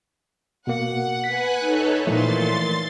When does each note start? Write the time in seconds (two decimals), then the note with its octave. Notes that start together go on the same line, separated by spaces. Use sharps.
0.67 B2 A#3 F#5
1.24 B4 G#5 F#6 B6
1.60 D#4 A4 C#5
2.07 A#2 E3 F3 A3 C6 A6